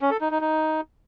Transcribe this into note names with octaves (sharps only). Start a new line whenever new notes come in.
C#4
A4
D#4
D#4
D#4